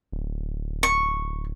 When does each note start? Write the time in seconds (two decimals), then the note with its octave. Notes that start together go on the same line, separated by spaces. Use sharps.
0.12 D1
0.83 C#6